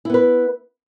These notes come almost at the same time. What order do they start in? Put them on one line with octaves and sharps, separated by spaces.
E4 B3 B4